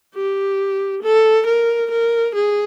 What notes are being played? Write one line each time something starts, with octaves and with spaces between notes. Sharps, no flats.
G4
A4
A#4
A#4
G#4